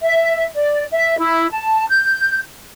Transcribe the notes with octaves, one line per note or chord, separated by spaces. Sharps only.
E5
D5
E5
E4
A5
G6